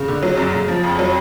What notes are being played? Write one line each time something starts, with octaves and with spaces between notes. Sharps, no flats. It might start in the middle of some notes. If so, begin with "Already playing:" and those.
Already playing: C#3
D3
F#3
F#2
C#3
F3
F2
F#3